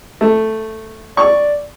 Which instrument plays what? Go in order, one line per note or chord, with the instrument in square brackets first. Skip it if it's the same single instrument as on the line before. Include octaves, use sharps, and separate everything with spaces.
[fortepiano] A3
[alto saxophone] D5 [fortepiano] C#6